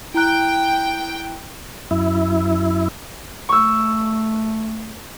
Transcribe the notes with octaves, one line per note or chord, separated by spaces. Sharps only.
E4 G5 A#5 F#6
F#2 E4
A3 C#6 E6